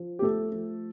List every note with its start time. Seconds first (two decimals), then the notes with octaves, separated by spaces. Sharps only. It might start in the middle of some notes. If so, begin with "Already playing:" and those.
Already playing: F3
0.19 G4
0.22 A3 A4
0.51 F3